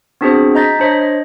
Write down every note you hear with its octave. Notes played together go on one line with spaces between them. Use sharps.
B3 C4 D4 F#4 G#4 C5
D#5 A#5 G6 A6 B6
D4 C5 C#5 D#5
D#5